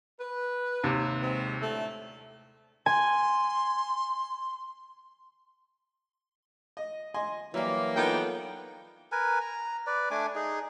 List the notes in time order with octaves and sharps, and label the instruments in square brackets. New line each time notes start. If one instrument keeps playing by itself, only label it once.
[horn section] B4
[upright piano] D#2 C3
[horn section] G#3 C4
A2 D3 A3
[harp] G#5 [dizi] C6
[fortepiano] D#5
D#5 G#5 C6
[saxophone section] E3 A#3 [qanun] F#3 G3 [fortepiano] E5
[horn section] B3 A#4 G5 [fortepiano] D#4 F4 A4
[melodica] A#4 B4 G#5
A#5
B4 D5
A3 D4 G#5 D6
D#4 G#4